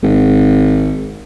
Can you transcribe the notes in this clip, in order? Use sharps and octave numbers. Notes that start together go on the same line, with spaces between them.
G#1